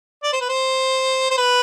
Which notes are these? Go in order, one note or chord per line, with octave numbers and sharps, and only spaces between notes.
D5
C5
B4
C5
C5
B4